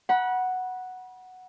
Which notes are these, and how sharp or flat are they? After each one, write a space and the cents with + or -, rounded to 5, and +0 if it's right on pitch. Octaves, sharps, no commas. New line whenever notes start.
F#5 +0 B5 -35